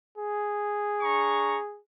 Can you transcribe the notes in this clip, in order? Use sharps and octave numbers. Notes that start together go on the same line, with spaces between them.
G#4
D4 A#5 C#6